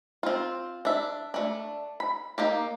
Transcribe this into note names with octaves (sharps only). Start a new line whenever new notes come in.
C4 F4
D4 E5
A3 D4
B5
A#3 D#4 G4